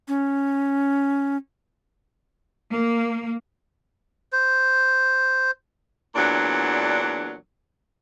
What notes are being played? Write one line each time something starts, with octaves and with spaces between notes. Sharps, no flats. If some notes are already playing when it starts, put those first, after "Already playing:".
C#4
A#3
C5
E2 A#2 F#3 D4